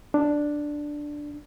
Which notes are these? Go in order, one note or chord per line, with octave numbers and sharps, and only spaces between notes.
D4